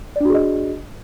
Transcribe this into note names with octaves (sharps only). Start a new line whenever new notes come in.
D4 F#4 G#4 D5 D#5